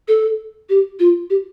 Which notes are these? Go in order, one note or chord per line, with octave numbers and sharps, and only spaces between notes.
A4
G4
F4
G4